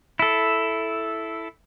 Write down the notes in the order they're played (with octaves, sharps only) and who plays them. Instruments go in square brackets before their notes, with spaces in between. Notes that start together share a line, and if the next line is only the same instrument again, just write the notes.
[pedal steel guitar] E4 A4